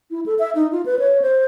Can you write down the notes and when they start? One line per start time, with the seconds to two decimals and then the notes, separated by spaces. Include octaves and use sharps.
0.11 E4
0.26 A4
0.39 E5
0.55 D#4
0.72 F4
0.86 B4
0.99 C#5
1.22 C5